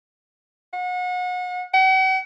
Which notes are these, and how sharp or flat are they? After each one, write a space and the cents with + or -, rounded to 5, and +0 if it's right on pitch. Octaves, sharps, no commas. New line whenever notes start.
F#5 -35
F#5 +40